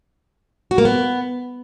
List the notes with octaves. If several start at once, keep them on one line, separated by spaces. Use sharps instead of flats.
F#4
A#3
B3